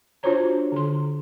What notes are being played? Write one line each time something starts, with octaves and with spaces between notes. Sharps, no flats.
D4 F4 F#4 C5 C#5 A#5
D3 C6